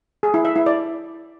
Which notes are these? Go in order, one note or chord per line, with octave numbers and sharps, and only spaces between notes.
G#4
E4
E5
E4
D5